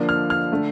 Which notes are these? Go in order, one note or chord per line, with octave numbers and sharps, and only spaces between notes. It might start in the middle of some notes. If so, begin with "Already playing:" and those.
Already playing: D3 F3 A#3 D4
F6
F6
D3 A3 D4